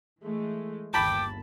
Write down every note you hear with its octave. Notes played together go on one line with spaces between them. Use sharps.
E3 G#3 A3
G1 D#2 G5 A5 B5 D6